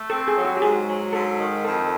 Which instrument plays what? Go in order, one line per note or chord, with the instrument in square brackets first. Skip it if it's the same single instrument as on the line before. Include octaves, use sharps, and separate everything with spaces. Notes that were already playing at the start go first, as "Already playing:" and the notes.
Already playing: [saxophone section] A3
[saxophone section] C4 [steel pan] A4
[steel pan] G#4
[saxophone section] F#3
[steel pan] F#4
G4
[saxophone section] G#2 [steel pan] G#4
[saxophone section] F#3
[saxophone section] G#2 [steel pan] A4
[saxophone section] D#3
[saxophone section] F2 [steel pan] A4